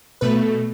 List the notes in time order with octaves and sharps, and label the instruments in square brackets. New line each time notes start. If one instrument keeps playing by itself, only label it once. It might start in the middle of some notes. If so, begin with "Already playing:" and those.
[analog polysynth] B2 A3 B4